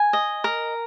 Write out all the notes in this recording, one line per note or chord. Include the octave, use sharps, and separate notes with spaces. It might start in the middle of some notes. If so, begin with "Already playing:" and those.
Already playing: G#5
D#5
A#4